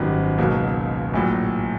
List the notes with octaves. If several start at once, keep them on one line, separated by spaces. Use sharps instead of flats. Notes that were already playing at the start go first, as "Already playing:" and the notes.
Already playing: G#1 F#2 D#3 G3 B3
C#2 B2 F#3 A#3 D#4
A#1 A2 F#3